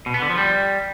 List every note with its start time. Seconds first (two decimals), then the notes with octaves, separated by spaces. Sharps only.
0.06 B2
0.14 B3
0.22 D3
0.30 F3
0.38 G3